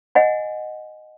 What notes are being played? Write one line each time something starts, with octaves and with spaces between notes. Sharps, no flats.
D#5 F#5 G#5